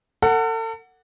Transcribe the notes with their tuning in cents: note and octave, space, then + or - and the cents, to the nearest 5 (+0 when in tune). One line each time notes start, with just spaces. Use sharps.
A4 +40 F#5 +0